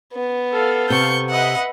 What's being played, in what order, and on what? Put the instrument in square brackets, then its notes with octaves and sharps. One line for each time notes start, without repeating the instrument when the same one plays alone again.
[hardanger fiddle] B3
[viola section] A4 F5
[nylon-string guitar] C3 [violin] C#6 G6
[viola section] B4 D#5 E5 [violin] F#5